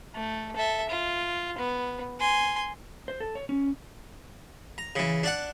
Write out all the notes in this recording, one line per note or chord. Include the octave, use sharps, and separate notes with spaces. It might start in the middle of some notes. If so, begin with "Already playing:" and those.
A3
A4 E5
F4
B3
G#5 C6
C5
A4
C#5
C#4
A#5
C#3 E3
D4 D5 F#5